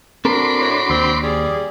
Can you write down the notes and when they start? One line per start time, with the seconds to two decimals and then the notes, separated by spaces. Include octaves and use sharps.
0.25 C4 D4 F#4 A4 A#4 B5 C6 D6
0.60 A2
0.90 D#2 C4
1.23 G3 G#4